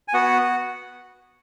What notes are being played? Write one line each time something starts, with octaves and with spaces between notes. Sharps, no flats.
G#5
B3 F#4 F#5